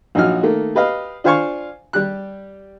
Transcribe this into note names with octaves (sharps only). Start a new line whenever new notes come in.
A#1 F#3 D#4 F#4 F6
D#3 A3 A#3
G4 B4 D#5 F5
D4 F4 C5 F5 G#5 C#6
G3 G4 F#6